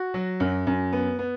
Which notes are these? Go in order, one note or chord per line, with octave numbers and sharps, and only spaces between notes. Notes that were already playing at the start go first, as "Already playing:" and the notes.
Already playing: F#4
F#3
F#2
F#2
B3
B3